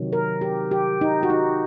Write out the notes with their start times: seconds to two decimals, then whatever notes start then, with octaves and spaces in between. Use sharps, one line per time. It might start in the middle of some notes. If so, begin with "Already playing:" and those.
Already playing: C3 D#3 F#3
0.13 A#4
0.41 G4
0.71 G4
1.01 D#4
1.23 F#4
1.30 D#4